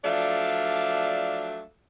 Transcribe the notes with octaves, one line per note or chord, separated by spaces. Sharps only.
F3 F#3 A3 D4 D5 F5